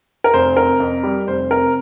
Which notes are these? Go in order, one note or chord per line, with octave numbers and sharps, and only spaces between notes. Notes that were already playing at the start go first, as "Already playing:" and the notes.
A#4
F1 C5
C3 A#4
F2
G3
F1 C5
C3 A#4